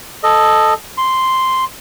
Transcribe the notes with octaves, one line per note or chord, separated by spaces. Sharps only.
A4 D#5
C6